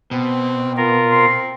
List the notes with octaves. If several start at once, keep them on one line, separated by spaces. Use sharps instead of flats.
B2 C4
B3 F4 A#4
C4 C6